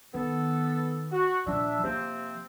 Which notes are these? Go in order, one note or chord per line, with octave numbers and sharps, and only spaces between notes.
D#3 B3 A4
F#4
A#2 F3 D4 E5
C3 F3 A#3 C4